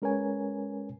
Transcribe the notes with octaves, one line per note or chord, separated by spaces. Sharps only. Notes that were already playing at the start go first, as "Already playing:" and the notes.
G#3 C#4 A#4 B4 C#5 G#5